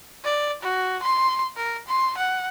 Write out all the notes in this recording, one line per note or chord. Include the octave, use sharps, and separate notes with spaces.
D5
F#4
C6
A#4
C6
F#5